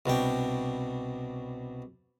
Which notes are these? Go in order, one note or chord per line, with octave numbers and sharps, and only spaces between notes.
C2 B2 D4 G5